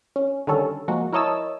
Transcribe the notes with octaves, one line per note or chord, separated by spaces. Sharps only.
C#4
D3 D#3 G3 C#4 A4
F3 G#3 A#3 F#4
E4 A#4 C#5 D#5 A5 E6